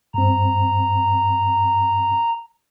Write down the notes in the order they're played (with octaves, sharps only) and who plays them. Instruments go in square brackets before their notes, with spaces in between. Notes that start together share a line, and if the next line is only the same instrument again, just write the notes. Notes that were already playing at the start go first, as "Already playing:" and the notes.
[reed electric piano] G2 C4 [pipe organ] A#5